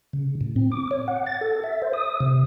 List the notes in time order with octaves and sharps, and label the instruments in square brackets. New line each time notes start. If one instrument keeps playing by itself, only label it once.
[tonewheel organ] C#3
A2
C4
D6
C#5
F#5
A6
A4
E5
C5
D#6
C3